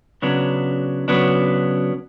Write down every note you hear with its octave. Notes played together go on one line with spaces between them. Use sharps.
C#3 F#3 B3 D4
C#3 F#3 B3 D4